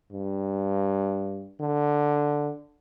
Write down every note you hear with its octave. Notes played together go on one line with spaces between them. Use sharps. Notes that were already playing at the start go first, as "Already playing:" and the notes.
G2
D3